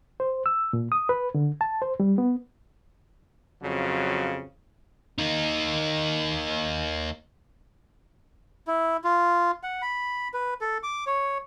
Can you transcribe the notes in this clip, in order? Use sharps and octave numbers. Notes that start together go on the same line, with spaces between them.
C5
E6
A#2
D#6
B4
D3
A5
C5
G3
B3
F2 C#3 F#3
A#3 D#4
E4
F4
F#5
B5
B4
A4
D6
C#5